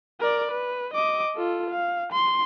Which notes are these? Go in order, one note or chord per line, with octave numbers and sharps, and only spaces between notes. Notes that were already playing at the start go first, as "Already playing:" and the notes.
A#4 D5
B4
D#5 D6
F4 A4
F5
C6